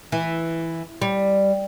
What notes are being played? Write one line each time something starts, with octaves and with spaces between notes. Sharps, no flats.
E3
G3